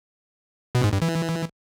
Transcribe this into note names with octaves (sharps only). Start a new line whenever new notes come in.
B2
G#2
G2
E3